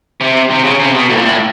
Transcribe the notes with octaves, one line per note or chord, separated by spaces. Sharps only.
C3
C3
C#3
C3
B2
A2
A#2
A2